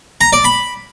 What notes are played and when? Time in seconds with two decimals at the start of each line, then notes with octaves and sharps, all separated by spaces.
0.21 A#5
0.33 D5
0.44 B5